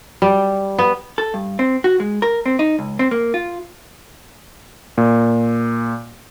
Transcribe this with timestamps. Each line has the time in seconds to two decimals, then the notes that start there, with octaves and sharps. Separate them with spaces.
0.22 G3
0.79 B3
1.18 A4
1.34 G2
1.59 C4
1.84 F#4
2.00 G#3
2.22 A#4
2.46 C4
2.59 D#4
2.79 C#2
2.99 C4
3.11 A#3
3.34 F4
4.98 A#2